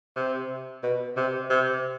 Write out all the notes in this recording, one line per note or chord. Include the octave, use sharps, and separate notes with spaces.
C3
B2
C3
C3